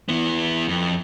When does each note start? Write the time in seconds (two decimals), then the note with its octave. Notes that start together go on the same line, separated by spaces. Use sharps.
0.09 E3 B3
0.68 F2